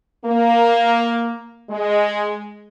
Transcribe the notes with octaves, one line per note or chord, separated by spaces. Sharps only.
A#3
G#3